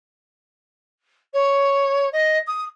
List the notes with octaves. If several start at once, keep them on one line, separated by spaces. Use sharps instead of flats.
C#5
D#5
D#6